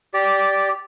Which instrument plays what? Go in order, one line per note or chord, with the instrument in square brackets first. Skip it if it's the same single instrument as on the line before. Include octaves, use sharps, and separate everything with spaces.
[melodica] G4 D5